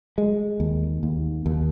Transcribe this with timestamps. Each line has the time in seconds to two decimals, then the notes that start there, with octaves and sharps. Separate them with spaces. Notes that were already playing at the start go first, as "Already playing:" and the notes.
0.18 G#3
0.60 D#2
1.03 D#2
1.46 D#2